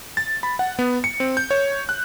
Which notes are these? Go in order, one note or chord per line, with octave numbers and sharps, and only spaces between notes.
A6
B5
F#5
B3
C#7
C4
G6
C#5
F#6